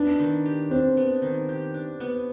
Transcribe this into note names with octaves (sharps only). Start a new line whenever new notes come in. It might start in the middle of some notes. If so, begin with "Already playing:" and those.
Already playing: B3 D4
D#3
G4
C4 D4
B3
D#3
G4
D4
B3